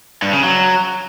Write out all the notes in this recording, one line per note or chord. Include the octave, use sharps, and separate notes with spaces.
G2
C#3
F#3